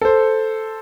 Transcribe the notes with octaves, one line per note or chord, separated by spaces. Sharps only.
A4 C5